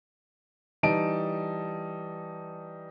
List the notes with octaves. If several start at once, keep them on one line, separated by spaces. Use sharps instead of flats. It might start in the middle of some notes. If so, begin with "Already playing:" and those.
E3 G3 D#4 A5 D7